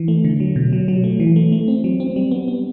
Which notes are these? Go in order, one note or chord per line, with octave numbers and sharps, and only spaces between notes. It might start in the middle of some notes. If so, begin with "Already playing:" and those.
Already playing: E3
A3
D3
F#3
B2
F#3
F#3
A3
E3
A3
A3
C4
F#3
C4
G3
B3
B3